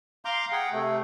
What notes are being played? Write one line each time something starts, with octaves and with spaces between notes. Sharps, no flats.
F5 A#5 C6 D6 G6
G#4 F#5 G5
C3 A3